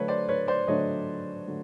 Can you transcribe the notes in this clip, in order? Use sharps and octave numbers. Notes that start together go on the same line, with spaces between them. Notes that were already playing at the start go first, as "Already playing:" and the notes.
Already playing: D3 F#3 A3 D4 B4 C#5
C5 D5
B4 C#5
C5 D5
D3 F#3 A3 D4 C#5 D#5
D3 F#3 A3